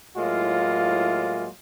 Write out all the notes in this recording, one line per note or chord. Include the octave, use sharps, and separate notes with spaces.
A2 F#3 G#3 A#3 E4 F4